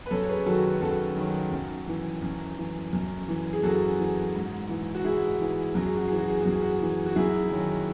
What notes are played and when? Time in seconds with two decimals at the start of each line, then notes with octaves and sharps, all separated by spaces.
0.06 B4
0.11 F#2 A4 C#5
0.23 C#5
0.29 G#4 B4
0.46 D#3 F#3 F#4 A4
0.64 F#4
0.82 F#2 F#4 A4
1.17 D#3 F#3
1.51 F#2
1.88 E3
2.22 F#2
2.58 E3
2.93 F#2
3.28 E3
3.53 G#4
3.63 F#2 F#4 A4
3.99 E3
4.35 G#2
4.69 E3
4.95 F#4
5.04 G#2 E4 G#4
5.40 E3
5.75 F#2 F#4
5.86 G#4
5.97 F#4
6.08 E3 G#4
6.19 F#4
6.30 G#4
6.41 F#2 F#4
6.51 G#4
6.62 F#4
6.81 E3
7.06 F#4
7.16 F#2 E4 G#4
7.51 D#3 F#3